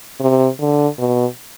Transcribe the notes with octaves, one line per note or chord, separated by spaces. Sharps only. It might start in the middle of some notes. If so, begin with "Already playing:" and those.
C3
D3
B2